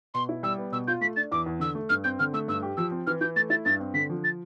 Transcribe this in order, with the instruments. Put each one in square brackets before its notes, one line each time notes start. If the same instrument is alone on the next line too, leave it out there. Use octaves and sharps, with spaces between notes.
[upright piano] B2 [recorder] C6
[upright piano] E4
[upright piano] G3 [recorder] E6
[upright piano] B3
[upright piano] B2 [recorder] E6
[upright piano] F4 [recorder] G6
[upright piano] A3 [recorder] B6
[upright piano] D4 [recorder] A6
[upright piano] E2 [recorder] D6
[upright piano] E2
[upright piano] D3 [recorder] E6
[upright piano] A3
[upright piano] G2 [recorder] F6
[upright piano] C4 [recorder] G6
[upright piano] D3 [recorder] F6
[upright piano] A3 [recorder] E6
[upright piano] G2 [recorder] E6
[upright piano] G4
[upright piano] F3 [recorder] E6
[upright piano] C4
[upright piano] E3 [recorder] F6
[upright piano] E3 [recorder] G6
[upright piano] A3 [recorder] A6
[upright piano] E4 [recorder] A6
[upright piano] G2 [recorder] A6
[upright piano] C4
[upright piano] D3 [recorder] B6
[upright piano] F3
[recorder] A6